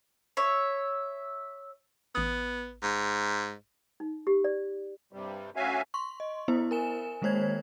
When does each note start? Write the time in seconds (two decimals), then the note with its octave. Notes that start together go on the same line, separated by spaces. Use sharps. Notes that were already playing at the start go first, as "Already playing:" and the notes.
0.37 C#5 E5
2.15 A1 B3 D#6
2.83 G#2
4.00 D#4
4.27 G4
4.44 D5
5.13 G2 C3 G3
5.56 D2 C#4 F#4 E5 F5 G#5
5.94 C6 C#6
6.20 D#5
6.48 B3 E4 C5
6.71 A#4 G#5 E7
7.22 D#3 G#3 A#3 C5 C#5 G#6